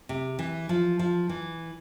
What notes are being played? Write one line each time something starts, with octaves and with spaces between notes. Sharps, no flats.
C3
E3
F3
F3
E3